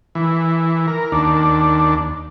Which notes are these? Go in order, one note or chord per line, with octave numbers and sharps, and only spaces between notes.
E3
A#4
D#2 D4